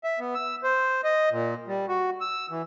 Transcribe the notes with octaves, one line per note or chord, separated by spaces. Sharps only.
E5
B3
E6
C5
D#5
A#2
G3
F#4
E6
E3